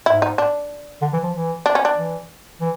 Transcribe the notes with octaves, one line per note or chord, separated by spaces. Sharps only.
G#2 E4
D#4
D4
D3
E3
F3
E3
D4
C#4
D4
E3
E3